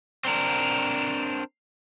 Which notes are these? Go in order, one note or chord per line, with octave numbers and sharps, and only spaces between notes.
C4 D4 A#4